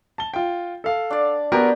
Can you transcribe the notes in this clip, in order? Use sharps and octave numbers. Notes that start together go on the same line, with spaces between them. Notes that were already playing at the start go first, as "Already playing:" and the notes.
A5 G7
F4 G5
A4 F5
D4 D5
B3 F#4 G4 A#4